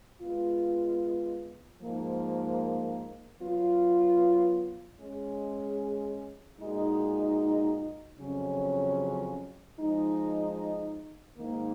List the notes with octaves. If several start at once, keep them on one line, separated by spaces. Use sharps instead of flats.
G#3 B3 F4
G#2 F3 A#3
F#3 B3 F4
G#3 C#4 G#4
A#2 G#3 D#4 F#4
F2 C#3 F#3 C#4
F3 G#3 D#4
G#2 D#3 A#3 D#4